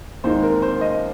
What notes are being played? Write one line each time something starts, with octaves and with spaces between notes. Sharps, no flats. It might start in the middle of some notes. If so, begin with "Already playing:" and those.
D#2 D#3 G#3 D#4 C5
A#4
C5
D#5